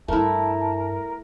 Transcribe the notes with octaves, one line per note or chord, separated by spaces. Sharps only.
G2 A3 E4 A#4 A5